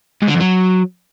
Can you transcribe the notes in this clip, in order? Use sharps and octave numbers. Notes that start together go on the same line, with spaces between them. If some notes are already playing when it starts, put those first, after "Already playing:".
G#2
D3
F2
F#3